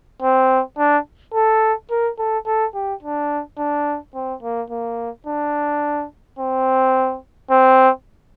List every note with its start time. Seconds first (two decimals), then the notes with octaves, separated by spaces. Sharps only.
0.22 C4
0.78 D4
1.34 A4
1.91 A#4
2.18 A4
2.46 A4
2.75 G4
3.03 D4
3.58 D4
4.15 C4
4.43 A#3
4.70 A#3
5.27 D4
6.39 C4
7.51 C4